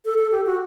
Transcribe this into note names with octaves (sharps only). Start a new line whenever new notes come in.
A4
A4
G4
F#4